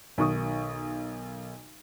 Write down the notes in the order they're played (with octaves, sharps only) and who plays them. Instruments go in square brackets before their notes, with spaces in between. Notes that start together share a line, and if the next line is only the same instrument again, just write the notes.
[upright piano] B1 D#3 C#6 D#6